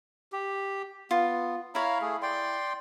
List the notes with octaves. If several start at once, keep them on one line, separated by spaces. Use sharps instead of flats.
G4
B3 F4
E4 C#5 F5 A#5 B5
A3 G#4
D5 G5 C6